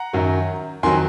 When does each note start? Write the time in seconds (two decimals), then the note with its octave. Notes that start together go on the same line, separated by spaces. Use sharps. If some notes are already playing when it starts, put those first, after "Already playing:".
Already playing: F#5 A#5
0.13 F#2 D#3 F#3
0.83 F2 D#3 F#3 G#5 C6